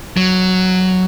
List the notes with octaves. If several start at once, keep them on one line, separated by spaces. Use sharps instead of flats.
F#3